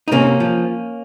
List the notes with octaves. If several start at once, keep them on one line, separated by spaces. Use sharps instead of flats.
D#4
C3 A#3 C#4
F3